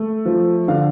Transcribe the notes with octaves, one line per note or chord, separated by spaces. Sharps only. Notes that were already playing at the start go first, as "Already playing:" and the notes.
Already playing: A3
F3
D3 F5